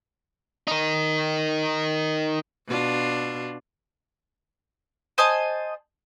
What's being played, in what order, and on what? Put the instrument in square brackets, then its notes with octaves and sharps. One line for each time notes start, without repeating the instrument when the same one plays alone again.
[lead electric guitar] D#4 A#4
[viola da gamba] B2 D4 F4
[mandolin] C5 D#5 G#5 A5